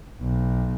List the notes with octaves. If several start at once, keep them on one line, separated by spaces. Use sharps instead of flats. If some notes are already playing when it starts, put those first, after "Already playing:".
B1